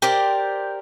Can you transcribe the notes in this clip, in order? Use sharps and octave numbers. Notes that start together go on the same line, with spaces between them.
G4 A#4 C5 D5